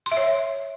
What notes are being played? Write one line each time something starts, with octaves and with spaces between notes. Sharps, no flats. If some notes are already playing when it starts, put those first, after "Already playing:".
C6
E5
C#5